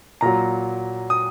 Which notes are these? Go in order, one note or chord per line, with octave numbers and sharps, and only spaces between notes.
A#2 F#3 A#5
D#6